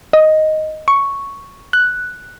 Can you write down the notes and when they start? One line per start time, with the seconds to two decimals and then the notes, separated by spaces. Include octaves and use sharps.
0.13 D#5
0.88 C#6
1.73 F#6